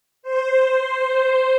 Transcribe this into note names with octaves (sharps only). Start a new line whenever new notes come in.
C5